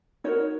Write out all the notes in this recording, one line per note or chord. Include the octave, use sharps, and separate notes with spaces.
D#4 F#4 A#4 C#5